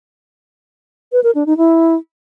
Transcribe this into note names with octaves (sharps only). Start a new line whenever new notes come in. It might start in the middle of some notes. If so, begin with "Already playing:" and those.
B4
A#4
D4
D#4
E4